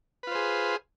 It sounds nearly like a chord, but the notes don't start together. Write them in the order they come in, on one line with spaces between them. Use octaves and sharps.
B4 F4 C5 G#4